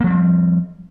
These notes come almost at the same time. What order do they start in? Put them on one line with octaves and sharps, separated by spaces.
A#3 F3 G3 C4